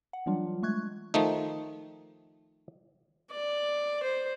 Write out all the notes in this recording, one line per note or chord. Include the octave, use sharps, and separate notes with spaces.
F#5
E3 F#3 G3 D4 F4
G#3 A3 C#6 F#6 G#6
D#3 F3 A3 D#4
D5
C5